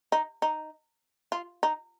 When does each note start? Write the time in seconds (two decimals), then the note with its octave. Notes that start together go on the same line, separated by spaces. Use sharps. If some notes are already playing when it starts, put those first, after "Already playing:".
0.12 D#4
0.42 D#4
1.32 F4
1.63 D#4